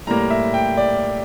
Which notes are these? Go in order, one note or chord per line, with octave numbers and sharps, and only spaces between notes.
A2 G3 A#3 A#5
E5
G5
D5